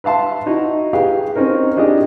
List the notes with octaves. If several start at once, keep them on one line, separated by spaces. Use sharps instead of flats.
B4 E5 F5 A5 C6
D#4 E4 F#4
G4 G#4 B4 F5
C4 C#4 D#4 A#4
D4 D#4 G4 G#4 D#5